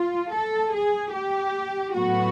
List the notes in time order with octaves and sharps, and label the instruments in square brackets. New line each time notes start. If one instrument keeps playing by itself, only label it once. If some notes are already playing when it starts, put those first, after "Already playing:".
Already playing: [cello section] F4
A4
G#4
G4
A2 F#3 B3 F#4